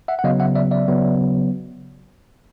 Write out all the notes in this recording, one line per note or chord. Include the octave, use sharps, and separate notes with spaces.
E5 F#5
F#5
C#3 F#3 B3 D#5 F5
E5 F#5
D5 E5
D5 E5
C#3 F#3 B3